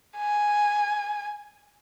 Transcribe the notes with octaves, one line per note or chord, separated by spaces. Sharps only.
G#5